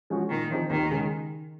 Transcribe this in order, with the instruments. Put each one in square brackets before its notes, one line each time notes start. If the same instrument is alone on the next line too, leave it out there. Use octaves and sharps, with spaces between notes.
[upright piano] F3 G#3 C#4 F#4
[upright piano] A#2 [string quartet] D#3
[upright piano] F3 C4 D#4 G#4
[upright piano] D#2 [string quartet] D#3
[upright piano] C#3 G#3